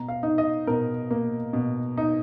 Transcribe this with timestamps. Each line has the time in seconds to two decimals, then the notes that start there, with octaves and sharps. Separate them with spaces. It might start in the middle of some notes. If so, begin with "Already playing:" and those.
Already playing: B2 A#5
0.08 F5
0.23 D#4
0.38 D#5
0.67 B2 A#4
1.11 A#3
1.53 B2
1.97 D#4